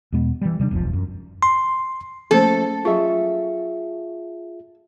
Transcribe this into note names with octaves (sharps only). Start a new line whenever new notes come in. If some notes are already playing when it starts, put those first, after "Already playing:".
E2 B2 G#3 B3
E3 G3
C3 G3 A3 D4
E1 B1 F2 F3
F#2
C6
F3 A3 A#3 C#4 A4 C5
F#3 F4 G#4 E5 C#6